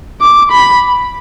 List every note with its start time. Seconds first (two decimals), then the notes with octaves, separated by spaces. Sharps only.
0.22 D6
0.52 B5